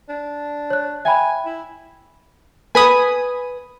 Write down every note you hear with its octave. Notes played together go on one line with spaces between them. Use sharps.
D4
C#5 F#6
E5 G5 G#5 B5
E4
B4 G#5 B5 D#6